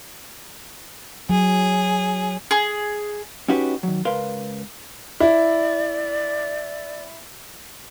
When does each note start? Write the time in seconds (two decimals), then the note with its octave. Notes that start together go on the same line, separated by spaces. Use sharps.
1.30 F#3 G#4
2.51 G#4
3.48 C#4 D#4 F#4 G4 B4
3.83 D#3 F#3
4.05 C#2 A#4 B4 F5 C6
5.20 E4 D5